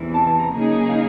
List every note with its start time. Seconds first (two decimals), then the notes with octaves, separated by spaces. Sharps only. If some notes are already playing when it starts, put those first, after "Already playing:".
Already playing: E2 C3 E3
0.14 A5
0.27 A5
0.39 A#5
0.51 C#3 F#3 A#3 D#4 G#4 A#5
0.89 F5